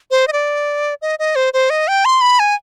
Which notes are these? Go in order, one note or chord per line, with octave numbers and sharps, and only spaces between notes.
C5
D#5
D5
D#5
D#5
C5
C5
D#5
G5
C6
B5
G#5